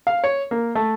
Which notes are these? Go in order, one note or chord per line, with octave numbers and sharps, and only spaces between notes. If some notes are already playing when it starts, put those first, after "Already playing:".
F5
C#5
A#3
A3